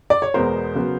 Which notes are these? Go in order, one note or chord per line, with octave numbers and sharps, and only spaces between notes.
D5
C#5
E2 B2 G#3 B3 A#4 C5
C#3 F#3 B3